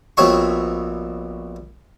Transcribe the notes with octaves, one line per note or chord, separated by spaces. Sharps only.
A#1 B2 C4 C#5 E5 C#6